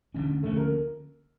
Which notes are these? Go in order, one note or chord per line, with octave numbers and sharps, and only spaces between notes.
D2 D3 F3 C#4
D2 D3 F3 A3 C#4 A4
A#3 A#4